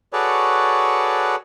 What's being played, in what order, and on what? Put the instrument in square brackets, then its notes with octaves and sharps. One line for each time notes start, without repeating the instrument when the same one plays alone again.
[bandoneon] F#4 G#4 A4 B4 C#5 D5